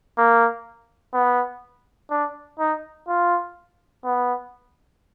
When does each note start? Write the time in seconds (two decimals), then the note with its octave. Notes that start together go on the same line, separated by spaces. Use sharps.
0.18 A#3
1.14 B3
2.11 D4
2.59 D#4
3.08 F4
4.05 B3